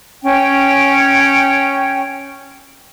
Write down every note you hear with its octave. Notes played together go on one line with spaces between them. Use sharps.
C#4 G5